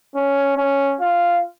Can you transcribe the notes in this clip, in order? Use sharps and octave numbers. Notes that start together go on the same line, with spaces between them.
C#4
C#4
F4